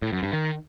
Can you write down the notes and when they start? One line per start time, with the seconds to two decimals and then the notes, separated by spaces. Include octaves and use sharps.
0.02 A2
0.13 F#2
0.23 G2
0.33 D#3